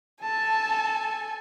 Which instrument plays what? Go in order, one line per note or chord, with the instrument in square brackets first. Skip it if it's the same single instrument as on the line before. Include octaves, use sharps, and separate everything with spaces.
[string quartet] A4 G#5 [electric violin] A5